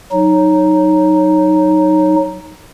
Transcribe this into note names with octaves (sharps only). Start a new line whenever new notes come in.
F#3 D#4